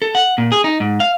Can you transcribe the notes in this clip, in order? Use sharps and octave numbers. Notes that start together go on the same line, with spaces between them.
A4
F#5
A#2
G#4
D#4
G#2
F5